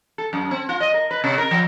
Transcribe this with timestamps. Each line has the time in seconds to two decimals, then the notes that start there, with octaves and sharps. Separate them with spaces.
0.18 A4
0.33 F#2
0.51 C4
0.69 F4
0.80 D#5
0.94 A#4
1.11 B4
1.24 C3
1.38 A#4
1.51 F3